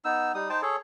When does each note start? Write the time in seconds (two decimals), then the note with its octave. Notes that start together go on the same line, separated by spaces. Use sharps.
0.05 B3 D#4 E6
0.34 G3 D#4 D#6
0.50 D#4 C5 G5 A5
0.62 G#4 A4 C#5